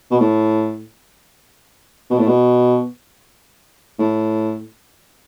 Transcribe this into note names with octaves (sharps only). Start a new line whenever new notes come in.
B2
A2
B2
A2
B2
A2